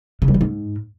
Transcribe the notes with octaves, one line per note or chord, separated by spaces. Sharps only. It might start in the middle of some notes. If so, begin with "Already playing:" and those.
C#3
G3
D#3
G#2